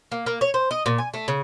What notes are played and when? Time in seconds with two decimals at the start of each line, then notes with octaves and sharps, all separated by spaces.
0.12 A#3
0.26 A#3
0.41 C#5
0.54 C5
0.71 D#5
0.86 A#2
0.98 G#5
1.14 A3
1.28 C#3